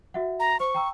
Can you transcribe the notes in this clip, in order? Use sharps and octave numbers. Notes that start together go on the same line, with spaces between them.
F#4 E5 F#5
A#5
C5 C#6
G5 A#5 E6